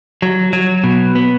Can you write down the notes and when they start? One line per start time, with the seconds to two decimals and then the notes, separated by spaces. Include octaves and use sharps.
0.22 F#3
0.53 F#3
0.84 B2
1.15 B3